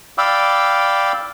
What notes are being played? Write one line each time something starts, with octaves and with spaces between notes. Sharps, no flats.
D5 F5 G5 B5 D6 E6